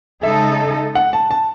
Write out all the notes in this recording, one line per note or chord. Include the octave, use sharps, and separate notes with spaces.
C#3 G#3 D#4 A4 D#5 E5
F#5
A5
A5